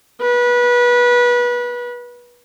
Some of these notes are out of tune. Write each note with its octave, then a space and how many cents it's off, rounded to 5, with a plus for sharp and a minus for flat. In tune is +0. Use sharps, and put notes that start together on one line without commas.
B4 -25